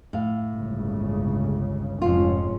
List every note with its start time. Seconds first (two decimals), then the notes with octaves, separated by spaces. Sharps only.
0.13 A2 F5
0.52 G1 C#2 C#3
2.02 F1 F2 G#2 C#4 F4